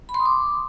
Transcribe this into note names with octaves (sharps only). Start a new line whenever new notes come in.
B5
C6
D#6
D6